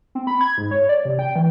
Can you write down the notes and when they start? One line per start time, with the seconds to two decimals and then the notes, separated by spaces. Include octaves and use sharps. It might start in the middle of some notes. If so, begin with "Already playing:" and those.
0.15 C4
0.27 B5
0.41 G#6
0.58 G#2
0.71 C#5
0.89 D5
1.05 C3
1.19 G5
1.36 E3